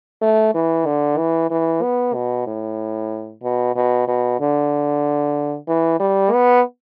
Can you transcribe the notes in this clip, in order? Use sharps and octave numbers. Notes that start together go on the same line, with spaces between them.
A3
E3
D3
E3
E3
B3
B2
A2
B2
B2
B2
D3
E3
G3
B3